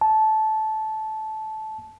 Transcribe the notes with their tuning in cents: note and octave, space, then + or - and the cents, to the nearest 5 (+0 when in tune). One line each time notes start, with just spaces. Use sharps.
A5 -15